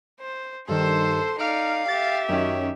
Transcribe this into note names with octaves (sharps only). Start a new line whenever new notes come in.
C5
G2 D#3 A4 C5 C6
D#4 D5 F5 F6 D7
G4 E5 A6
F#2 D#3 C#4